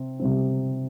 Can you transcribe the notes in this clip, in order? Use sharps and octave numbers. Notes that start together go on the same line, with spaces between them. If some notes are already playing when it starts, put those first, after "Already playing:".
Already playing: C3 C4
C3 G3 C4